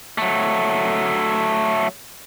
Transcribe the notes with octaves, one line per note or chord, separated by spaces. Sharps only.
F#3 A3